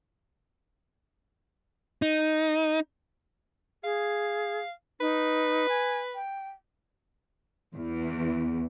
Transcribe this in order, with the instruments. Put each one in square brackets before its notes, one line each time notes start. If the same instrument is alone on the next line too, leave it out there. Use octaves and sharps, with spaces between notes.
[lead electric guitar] D#4
[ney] G#4 [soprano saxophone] F5
[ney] D#4 [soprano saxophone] B4
[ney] G#5
G5
[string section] E2